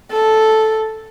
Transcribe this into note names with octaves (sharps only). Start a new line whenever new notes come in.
A4